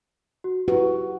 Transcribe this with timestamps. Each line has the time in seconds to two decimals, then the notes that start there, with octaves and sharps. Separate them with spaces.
0.44 F#4
0.68 E4 F#4 G4 B4